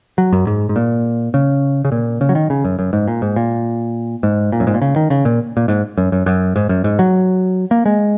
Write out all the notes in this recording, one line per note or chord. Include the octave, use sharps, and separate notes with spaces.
F#3
F#2
G#2
G#2
A#2
C#3
C#3
A#2
C#3
F#3
D#3
C#3
F#2
F#2
G#2
A#2
G#2
A#2
G#2
A#2
F#2
G#2
A#2
C#3
D#3
C#3
A#2
A#2
G#2
F#2
F#2
F#2
G#2
F#2
G#2
F#3
A#3
G#3